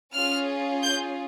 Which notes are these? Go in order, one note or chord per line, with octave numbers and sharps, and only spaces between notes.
C#4 F4 G#4 F6
G6